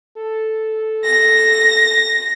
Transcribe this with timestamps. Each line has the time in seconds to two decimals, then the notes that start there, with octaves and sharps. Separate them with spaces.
0.17 A4
1.04 A#6